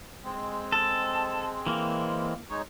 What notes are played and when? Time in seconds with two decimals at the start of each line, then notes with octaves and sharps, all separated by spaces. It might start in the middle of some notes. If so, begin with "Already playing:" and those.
0.24 G#3 C4
0.72 A4
1.66 E3 A#3
2.50 G#3 D#4 C#5